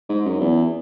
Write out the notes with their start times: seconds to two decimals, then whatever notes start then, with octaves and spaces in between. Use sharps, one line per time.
0.09 G#2
0.25 F#2
0.40 E2